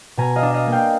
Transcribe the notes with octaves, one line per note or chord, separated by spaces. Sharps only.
B2 G#5 A#5
D#5 F5
D4
D#5 F5
A#3
F5 G5